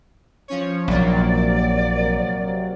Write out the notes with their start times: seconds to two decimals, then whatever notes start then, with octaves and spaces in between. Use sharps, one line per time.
0.48 F3 C#4 C#5
0.88 A#1 C3 F#3 A#3 D5